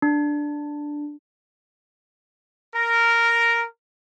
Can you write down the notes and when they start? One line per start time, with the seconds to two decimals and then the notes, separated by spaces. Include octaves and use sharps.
0.02 D4
2.76 A#4